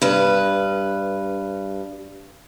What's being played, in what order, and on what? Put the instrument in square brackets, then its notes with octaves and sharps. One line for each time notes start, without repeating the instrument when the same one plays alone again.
[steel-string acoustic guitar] G2 B4